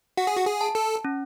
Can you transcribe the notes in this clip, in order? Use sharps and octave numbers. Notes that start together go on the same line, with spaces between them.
F#4 F#5
G#4
F#4
G#4
A5
A4
C#4